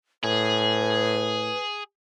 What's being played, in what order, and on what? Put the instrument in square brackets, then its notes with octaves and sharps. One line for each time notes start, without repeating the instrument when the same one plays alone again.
[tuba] A2 [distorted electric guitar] G#4 [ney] B4